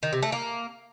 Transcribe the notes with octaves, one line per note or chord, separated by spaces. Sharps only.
D#3
C3
A3
A#3